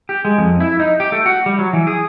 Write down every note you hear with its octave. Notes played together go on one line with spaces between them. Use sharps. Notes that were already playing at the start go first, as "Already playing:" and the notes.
G4
G#3
F2
E4
D#4
G4
A3
F#4
G3
F#3
E3
G#4